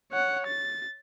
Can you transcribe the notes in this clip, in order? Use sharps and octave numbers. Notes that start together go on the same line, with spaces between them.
C#5 F#5
A6